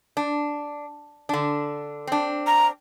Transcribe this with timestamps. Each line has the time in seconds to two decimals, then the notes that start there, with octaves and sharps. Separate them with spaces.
0.17 D4
1.29 D3 D4
2.07 C4 D4
2.47 A#5